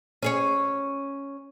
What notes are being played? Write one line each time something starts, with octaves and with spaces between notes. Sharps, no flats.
C#4 G#4 C#5